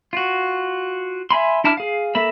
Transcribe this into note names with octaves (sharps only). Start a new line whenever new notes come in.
F4 F#4
E5 G#5 B5 C6
D4 E4 A5 D6 F6
G#4 F5
A#3 A4 E5 B5